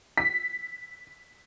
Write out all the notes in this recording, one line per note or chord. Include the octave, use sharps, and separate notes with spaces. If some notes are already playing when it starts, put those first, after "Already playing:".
B6